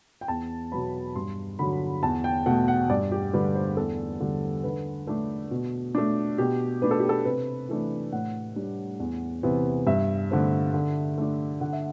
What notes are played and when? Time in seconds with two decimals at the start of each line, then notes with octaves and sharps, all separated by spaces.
0.21 G5
0.28 E2 A5
0.72 B2 F#3 B3 B5
1.15 G2 C6
1.59 D3 F#3 B5
2.03 E2 A5
2.24 G5
2.46 B2 A3 F#5
2.68 F#5
2.90 G2 D5
3.12 G4
3.33 D3 G3 D4 B4
3.55 C5
3.77 E2 A4
4.20 D3 G3
4.64 D3 B4
5.07 A3 D4
5.51 B2
5.95 A3 D4
6.38 B2 G4
6.82 A3 D4 B4
6.91 A4
7.00 G4
7.09 A4
7.25 C3 B4
7.69 E3 A3 D4
8.12 A2 F#5
8.56 G3 D4
9.00 E2
9.43 C3 E3 B3
9.87 G2 E5
10.30 D3 A3 C4
10.74 D3
11.18 A3 D4
11.61 D3 F#5
11.73 E5